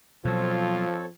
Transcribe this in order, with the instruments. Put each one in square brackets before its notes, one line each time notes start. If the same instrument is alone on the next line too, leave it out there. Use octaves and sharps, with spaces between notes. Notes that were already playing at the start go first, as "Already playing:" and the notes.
[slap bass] B2 F#3 [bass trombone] F3 [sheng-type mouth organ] C4 A4 C#5 [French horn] F4